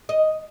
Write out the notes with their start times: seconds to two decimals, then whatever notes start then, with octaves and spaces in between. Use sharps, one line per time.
0.09 D#5